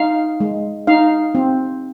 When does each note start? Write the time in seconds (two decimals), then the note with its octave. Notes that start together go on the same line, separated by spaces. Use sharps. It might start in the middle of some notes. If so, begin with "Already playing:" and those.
Already playing: D#4 F5
0.40 G#3
0.87 D#4 F5
1.35 C4